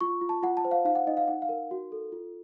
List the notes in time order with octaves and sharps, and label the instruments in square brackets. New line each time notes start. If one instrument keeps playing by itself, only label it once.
[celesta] F4 C#6
F4
A5
F4 F#5
A5
C5
F5
D#4 F5
F#5
D#4 D#5
F5
D#4 F#5
F5
A#4
F#4
A4
F4